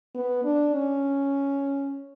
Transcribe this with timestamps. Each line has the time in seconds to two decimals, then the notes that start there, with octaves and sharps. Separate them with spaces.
0.15 B3
0.44 D4
0.74 C#4